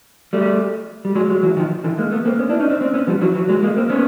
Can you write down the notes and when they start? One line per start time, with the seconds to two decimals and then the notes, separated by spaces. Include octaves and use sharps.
0.33 G3 A3
1.05 G3
1.15 F#3 G#3
1.29 F#3 G#3
1.43 E3 F#3
1.57 D#3 F3
1.84 D3 E3
1.98 G#3 A#3
2.11 A3 B3
2.26 A#3 C4
2.39 B3 C#4
2.49 D4 E4
2.60 C#4 D#4
2.70 C4 D4
2.80 C4 D4
2.94 B3 C#4
3.07 F3 G3
3.21 E3 F#3
3.35 E3 F#3
3.48 F#3 G#3
3.63 G#3 A#3
3.77 A#3 C4
3.89 B3 C#4